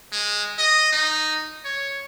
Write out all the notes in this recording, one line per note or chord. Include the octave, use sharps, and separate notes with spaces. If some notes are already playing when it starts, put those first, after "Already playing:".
G#3
D#5
D#4
C#5